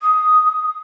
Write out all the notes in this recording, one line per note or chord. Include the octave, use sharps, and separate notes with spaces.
D#6